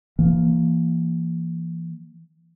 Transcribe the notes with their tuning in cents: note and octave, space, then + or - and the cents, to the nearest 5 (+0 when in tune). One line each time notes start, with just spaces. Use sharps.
E3 +30 A#3 +0